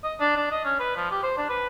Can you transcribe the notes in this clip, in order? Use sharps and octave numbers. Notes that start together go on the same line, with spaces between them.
D#5
D4
D4
D#5
C#4
B4
F3
G4
C5
D4
B4